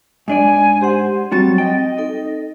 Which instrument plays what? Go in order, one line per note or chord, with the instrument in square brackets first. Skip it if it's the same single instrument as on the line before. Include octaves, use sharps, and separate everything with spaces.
[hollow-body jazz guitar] G#2 D4 D5 [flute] G#5
[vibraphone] G4 F#5 [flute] C5
[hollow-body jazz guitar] F#3 G3 F#4 [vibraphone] C4 [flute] A6
[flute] D#5 [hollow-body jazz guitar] G5
[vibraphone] D#4 A4